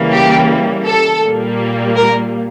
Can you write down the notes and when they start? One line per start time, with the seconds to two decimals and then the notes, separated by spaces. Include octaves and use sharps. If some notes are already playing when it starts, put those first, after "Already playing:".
Already playing: C#3 E3 G3 A#3
0.11 G4
0.85 A4
1.23 A#2 G3 A#3
1.96 A#4